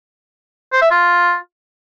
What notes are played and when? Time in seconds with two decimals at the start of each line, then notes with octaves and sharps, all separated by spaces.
0.72 C5
0.81 E5
0.91 F4